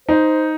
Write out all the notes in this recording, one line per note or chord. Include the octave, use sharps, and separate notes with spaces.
D#4 C5